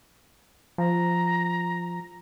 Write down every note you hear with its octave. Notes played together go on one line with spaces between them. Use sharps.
F3 A#5